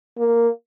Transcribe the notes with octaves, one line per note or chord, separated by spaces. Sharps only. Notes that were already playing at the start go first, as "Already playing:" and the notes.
A#3